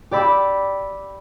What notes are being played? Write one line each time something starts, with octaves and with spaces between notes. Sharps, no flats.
G4 D5 B5 E6